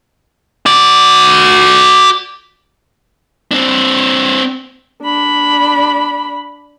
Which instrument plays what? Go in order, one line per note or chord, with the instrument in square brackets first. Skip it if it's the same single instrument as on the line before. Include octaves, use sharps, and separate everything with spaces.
[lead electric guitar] F#4 D5
C4 D4
[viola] D4 B5